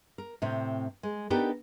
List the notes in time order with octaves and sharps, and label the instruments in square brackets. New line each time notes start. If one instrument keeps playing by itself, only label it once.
[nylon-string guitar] A#4
A2 C3 C4
G#3
B3 D4 D#4 G4 A4 A#4